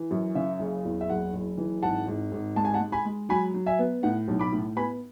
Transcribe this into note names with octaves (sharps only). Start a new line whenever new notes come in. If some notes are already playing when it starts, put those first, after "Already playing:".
Already playing: E3
F#2
C#3 E5
F#1
E2
E5
F#1 F#5
F#1
E3
G#1 F#5 A5
G#1
G#1
G#3 A5
G#5
F#5 A5
G#3
G#5 B5
G#3
F#3 G#5 B5
F#3
E5 G#5
B3
A2 F#5
B1
B5 D6
A2
B3 G#5 B5